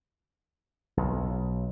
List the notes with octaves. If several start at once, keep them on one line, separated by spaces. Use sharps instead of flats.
B1